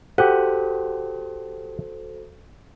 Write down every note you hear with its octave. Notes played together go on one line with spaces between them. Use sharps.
F#4 G4 A4 C5 F#5